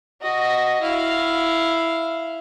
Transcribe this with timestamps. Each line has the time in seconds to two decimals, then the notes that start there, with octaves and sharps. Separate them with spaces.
0.22 F#4 D#5
0.82 E4 F5